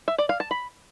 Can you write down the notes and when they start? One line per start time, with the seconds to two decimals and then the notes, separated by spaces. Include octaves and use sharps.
0.08 E5
0.18 D5
0.29 F5
0.40 A5
0.51 B5